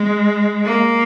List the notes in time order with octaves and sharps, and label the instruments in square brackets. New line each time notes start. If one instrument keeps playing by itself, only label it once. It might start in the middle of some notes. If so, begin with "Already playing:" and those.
Already playing: [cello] G#3
A#3